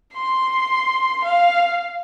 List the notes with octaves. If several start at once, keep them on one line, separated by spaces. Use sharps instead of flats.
C6
F5